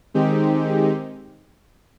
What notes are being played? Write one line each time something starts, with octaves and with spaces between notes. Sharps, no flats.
D#3 G#3 C4 D#4 G4